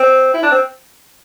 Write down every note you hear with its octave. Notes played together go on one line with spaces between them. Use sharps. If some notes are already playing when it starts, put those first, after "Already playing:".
Already playing: C4
E4
D4
C4